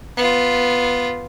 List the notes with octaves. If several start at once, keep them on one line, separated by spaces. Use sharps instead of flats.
B3 F4